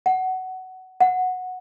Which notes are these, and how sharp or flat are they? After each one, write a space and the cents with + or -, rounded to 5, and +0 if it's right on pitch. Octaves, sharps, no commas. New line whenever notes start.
F#5 +15
F#5 -10